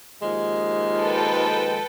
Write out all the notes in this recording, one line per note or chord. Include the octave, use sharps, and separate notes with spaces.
D#2 F3 G#3
A4 B4 G5